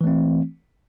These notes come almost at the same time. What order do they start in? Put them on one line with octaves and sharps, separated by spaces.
E3 A3 C4